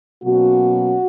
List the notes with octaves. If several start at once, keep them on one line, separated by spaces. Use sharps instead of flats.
B2 F#3 A#3 C#4 F#4